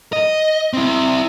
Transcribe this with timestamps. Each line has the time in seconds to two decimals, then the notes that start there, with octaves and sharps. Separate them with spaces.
0.13 D#5
0.73 C4 E4